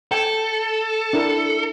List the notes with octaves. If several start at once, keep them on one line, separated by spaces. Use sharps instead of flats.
A4 G5 G#5
D4 E4 A#4